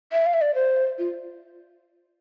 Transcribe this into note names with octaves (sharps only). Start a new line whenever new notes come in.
E5
F5
E5
D5
C5
F4